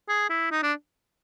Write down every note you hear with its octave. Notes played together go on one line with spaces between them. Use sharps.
G#4
E4
D#4
D4